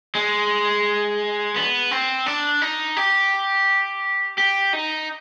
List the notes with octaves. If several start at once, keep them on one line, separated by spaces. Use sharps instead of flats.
G#3
B3
C4
D4
D#4
G4
G4
D#4